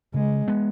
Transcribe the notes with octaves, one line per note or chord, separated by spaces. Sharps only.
C#3 G#3
G#3 B3